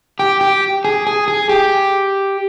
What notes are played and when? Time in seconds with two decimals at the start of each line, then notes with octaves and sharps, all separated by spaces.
0.19 G4
0.41 G4
0.85 G#4
1.07 G#4
1.28 G#4
1.49 G4